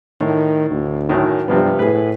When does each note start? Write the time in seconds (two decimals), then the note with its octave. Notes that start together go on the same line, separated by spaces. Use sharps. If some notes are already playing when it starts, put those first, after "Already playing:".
0.21 A2 D#3
0.70 D2
1.09 F#2 A2 D#3
1.48 G2 C3 F3 B3
1.79 A2 G#4 B4